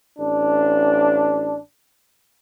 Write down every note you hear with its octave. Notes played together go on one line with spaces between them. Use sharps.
A1 D4